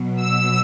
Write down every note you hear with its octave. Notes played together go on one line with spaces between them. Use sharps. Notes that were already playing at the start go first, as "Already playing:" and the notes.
Already playing: B2 F#3
E6